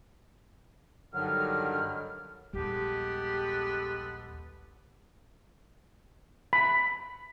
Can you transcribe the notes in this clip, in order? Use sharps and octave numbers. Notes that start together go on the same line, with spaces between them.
G2 D3 D#3 F#3 F6
A#1 D#2 G3 G#3 B3 G4 A4
B5